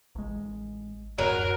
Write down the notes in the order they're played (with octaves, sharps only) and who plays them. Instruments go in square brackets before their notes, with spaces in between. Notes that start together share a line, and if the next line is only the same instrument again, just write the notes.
[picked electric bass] A1 G#3
[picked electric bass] D1 F#2 [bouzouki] F#3 [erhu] A#4